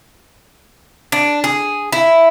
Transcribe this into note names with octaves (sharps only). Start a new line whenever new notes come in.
D4
G#4
E4